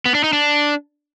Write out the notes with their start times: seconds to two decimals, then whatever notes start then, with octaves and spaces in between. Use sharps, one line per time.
0.06 B3
0.15 D4
0.24 D#4
0.33 D4